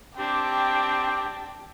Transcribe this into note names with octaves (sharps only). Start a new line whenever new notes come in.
C4 D4 G4 G5